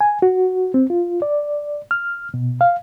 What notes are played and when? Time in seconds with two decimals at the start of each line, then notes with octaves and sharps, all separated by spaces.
0.01 G#5
0.22 F#4
0.74 C4
0.90 F4
1.22 D5
1.91 F6
2.34 B2
2.61 F5